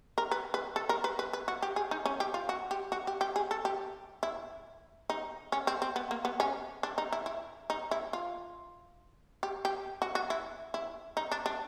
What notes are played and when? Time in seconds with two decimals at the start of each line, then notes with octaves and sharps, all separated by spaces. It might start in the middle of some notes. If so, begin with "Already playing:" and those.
0.18 A#4
0.31 B4
0.54 B4
0.76 A4
0.89 A#4
1.04 B4
1.19 B4
1.33 B4
1.48 F#4
1.62 G4
1.76 G#4
1.91 D#4
2.06 C#4
2.20 G4
2.34 F4
2.49 F#4
2.71 G4
2.92 F#4
3.07 G4
3.21 G4
3.36 G#4
3.51 A4
3.65 G4
4.23 E4
5.10 D#4
5.52 C#4
5.67 C4
5.82 C4
5.96 B3
6.11 A#3
6.25 B3
6.40 C#4
6.83 D4
6.98 D#4
7.13 E4
7.26 E4
7.70 D#4
7.91 E4
8.13 F4
9.43 G4
9.65 G4
10.02 F#4
10.15 F#4
10.30 E4
10.74 E4
11.17 D#4
11.32 D4
11.46 D4